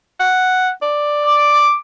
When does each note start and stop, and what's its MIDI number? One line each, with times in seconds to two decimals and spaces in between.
0.20 0.70 78
0.82 1.65 74
1.26 1.79 86